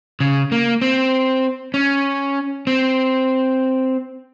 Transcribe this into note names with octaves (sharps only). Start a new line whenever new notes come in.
C#3
A#3
C4
C#4
C4